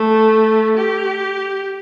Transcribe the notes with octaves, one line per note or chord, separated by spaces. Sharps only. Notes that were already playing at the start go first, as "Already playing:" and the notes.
Already playing: A3
G4